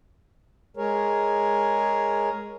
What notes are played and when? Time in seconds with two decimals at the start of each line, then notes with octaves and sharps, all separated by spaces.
0.77 G#3 G#4 A#4 C#5